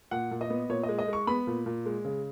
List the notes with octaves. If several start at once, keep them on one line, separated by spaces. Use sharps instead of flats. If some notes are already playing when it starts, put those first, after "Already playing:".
A#2 F#5
A#2
D#5
B3
A#2 C#5
D#5
G#3
D#5
G#3 C#6
B3 B5
A#2
A#2
G#3
C#3